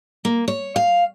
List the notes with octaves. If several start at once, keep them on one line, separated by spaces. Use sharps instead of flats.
A#3
C#5
F5